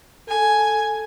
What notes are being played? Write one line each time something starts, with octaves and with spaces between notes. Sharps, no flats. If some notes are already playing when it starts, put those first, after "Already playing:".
A4 G#5